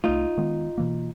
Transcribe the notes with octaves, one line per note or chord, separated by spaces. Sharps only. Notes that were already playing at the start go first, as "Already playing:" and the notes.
C2 A3 D#4 F4
D#3 G#3 B3
B2 E3 A#3